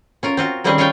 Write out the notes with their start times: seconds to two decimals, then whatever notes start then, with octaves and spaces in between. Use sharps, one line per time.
0.23 C#4 F4 A#4
0.37 C4 F4 F#4
0.64 D#3 G3 C4 C#4 G#4 D#5
0.78 F4 C#5 D#5 F5 G5